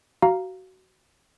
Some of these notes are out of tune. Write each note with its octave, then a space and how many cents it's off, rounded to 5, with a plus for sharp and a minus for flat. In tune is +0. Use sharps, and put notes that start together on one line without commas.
F#4 +20 F5 +0 A#5 +0